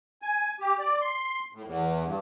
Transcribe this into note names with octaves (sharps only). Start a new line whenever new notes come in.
G#5
G4
D5
C6
A2
E2
G2